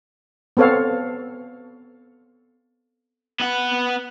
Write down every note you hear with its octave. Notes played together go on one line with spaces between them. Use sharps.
B3 C4 A4 C#5 F5
B3 F#5